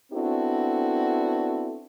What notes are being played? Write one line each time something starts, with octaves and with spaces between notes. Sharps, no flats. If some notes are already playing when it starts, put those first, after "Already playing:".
B3 C4 D4 E4 F#4 A4